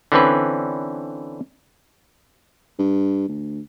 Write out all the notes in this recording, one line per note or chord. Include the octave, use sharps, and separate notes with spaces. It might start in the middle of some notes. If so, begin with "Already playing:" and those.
D3 E3 C4 C#4 B4
G2
D2